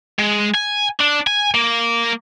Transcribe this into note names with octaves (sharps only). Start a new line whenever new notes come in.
G#3
G#5
D4
G#5
A#3